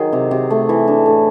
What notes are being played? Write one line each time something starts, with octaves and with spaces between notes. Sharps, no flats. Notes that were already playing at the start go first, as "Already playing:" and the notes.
Already playing: D#3 F#3 G#4
C3
C3
A3
E3
D4
A2